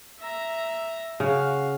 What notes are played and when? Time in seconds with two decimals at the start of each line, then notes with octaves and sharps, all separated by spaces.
0.20 E5 A#5
1.20 C#3 F#4 F5